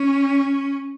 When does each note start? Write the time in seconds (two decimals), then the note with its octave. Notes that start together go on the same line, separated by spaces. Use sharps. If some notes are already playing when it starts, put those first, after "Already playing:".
Already playing: C#4